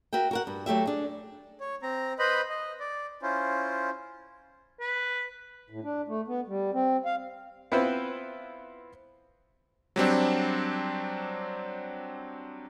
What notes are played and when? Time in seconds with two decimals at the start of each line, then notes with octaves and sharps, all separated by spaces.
0.13 F#4 A#4 E5 G5
0.31 F#4 A#4 F#5
0.47 G2
0.66 F#3 A3 G4 E5
0.86 D4 G#4
1.60 C#5
1.82 C4 A#5
2.19 B4 C5 D#5 B5
2.50 D#5
2.80 D5
3.22 C#4 E4 F4 C5
4.80 B4
5.70 A2
5.84 D4
6.08 A3
6.28 B3
6.47 G3
6.74 C4
7.05 F5
7.72 B3 C4 E4 F4 B4 C5
9.96 F#3 G3 C4 D4